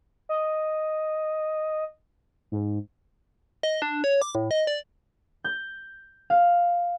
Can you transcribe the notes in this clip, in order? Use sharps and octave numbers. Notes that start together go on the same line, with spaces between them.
D#5
G#2
D#5
D4
C#5
D6
A2
D#5
D5
G6
F5